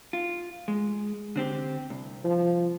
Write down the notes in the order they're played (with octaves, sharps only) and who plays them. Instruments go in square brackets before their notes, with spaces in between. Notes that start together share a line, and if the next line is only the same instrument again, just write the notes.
[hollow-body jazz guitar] F4
G#3
D3 C4 G4
C2
[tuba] F3